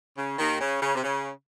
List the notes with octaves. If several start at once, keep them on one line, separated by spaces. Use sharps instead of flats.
C#3
D#2 D#3
C#3
C#3
C3
C#3